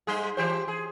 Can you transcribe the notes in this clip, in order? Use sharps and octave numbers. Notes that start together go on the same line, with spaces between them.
G#2 G3 G#4
E3 G4 C5
G#4